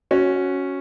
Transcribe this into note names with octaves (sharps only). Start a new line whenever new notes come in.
C#4 F#4